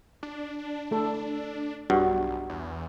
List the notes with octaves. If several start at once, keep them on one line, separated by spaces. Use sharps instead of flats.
D4
A3 A4
B1 G2 F#4
E2